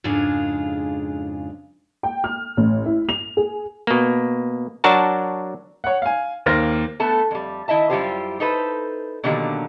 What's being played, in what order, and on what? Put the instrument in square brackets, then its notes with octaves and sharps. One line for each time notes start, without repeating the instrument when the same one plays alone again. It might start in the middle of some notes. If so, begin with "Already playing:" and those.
[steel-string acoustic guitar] F2 G#2 C#3 D4 F4 G#4
[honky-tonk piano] G5
F6
A1
E4
F7
G#4
[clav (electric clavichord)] B2 A#3
F#3 D4 F#4 A#4 A5
[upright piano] C#5 F#5
F5 G#5
D#2 A#3 C5 F6 A#6
[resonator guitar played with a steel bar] A3 B3 A4 A5
F2 G3
D#3 E4 D#5 E5 A5
F#2 G3 E4 F4 G4 C5
D#4 A4 B4 C5
B2 D3 D#3 F#3 A#3 G4